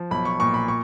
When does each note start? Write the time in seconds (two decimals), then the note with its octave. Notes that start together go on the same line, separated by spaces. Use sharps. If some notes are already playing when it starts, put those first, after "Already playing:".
Already playing: F3
0.11 B1 B5
0.25 C#6
0.40 A#2 C#6
0.54 B5
0.68 C#6